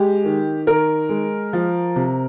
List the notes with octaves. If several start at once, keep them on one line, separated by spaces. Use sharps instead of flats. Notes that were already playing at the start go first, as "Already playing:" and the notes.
Already playing: G#3 G4
D#3
D#3 A#4
G#3
F3
C3